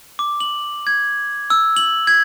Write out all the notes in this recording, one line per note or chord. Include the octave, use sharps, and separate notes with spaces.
D6
F#7
G#6
E6
F#7
G#6